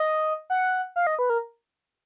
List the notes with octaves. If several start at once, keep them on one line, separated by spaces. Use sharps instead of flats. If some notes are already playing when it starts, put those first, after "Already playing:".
Already playing: D#5
F#5
F5
D#5
B4
A#4